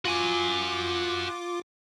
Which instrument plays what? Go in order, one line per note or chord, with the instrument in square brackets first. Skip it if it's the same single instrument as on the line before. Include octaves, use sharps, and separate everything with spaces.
[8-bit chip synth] F4 D6 [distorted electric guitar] F#4 G#5